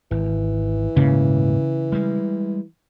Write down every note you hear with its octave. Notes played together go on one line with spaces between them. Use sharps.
G#1 E3
D#1 G#2 C#3 A#3
G3 G#3